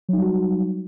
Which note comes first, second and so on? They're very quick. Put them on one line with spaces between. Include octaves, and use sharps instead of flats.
F#3 D#4 G3 F#4